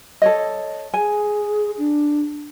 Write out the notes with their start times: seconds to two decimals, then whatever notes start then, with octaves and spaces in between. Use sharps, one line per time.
0.22 A4 C#5 D#5
0.94 G#4 G#5
1.78 D4